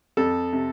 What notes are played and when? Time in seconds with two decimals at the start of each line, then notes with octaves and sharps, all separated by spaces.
0.17 F2 A4
0.53 C3